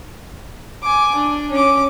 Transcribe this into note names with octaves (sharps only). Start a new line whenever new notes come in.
G#5 D6
D4
C#4 D6